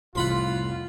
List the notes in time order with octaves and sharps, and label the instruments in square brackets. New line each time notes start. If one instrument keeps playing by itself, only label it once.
[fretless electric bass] C2 F2 A2 [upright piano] F3 [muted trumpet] F4 [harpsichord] F#5 B5 C6